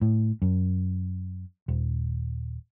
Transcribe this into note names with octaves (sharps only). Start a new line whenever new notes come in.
A2
F#2
D#1